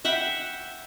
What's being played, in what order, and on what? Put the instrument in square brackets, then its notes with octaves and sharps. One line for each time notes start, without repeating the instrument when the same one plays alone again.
[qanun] E5 F#5 G5 B5